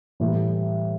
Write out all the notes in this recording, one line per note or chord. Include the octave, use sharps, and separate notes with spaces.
A2 E3 G3